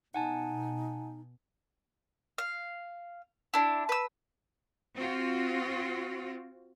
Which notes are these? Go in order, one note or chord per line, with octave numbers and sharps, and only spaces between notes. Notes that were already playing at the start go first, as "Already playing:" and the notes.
B2 D#4 F#5 G#5 A5
F5
D4 E4
B4 E6
C4 F4 F#4